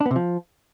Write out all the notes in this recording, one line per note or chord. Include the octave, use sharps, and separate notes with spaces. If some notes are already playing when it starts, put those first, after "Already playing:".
D4
B3
C3
F3